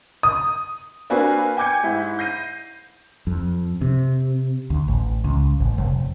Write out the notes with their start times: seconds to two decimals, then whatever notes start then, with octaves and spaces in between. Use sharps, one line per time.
0.23 D#6
1.10 A#3 C4 D4 F#4 B4 G#5
1.57 G5 G#5 D6 G6 G#6 C#7
1.83 G#2 E4
2.19 G6 A#6 C7 D#7
3.27 F2
3.81 C3
4.70 D2
4.88 A1
5.24 C#2
5.60 A1
5.78 F1